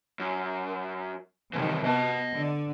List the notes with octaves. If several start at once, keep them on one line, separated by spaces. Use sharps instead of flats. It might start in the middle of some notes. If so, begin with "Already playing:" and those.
F#2
C3 D#3 E3 G3
B3 D#5 A5
D3